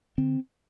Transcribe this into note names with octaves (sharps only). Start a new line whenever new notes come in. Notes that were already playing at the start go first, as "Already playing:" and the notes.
D3 C4